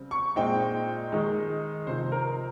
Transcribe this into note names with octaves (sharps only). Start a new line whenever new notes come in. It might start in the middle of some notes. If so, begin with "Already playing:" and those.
Already playing: C#3 G3 C4
C#6
A#2 G#3 C4 D#4 G5
D#3 G#3 D#4
C3 F3 C4 D#4 C5
A#4